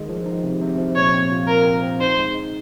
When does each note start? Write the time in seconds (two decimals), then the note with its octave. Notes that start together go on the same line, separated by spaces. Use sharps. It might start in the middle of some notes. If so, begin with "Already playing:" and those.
Already playing: D#3 G#3
0.09 F3
0.26 D#4
0.43 C3
0.61 C3
0.78 F3
0.96 A#2 C#5
1.14 C4
1.31 F4
1.48 F4 A#4
1.65 C4
1.83 C4
2.00 D#4 C5
2.18 G#3
2.35 D#4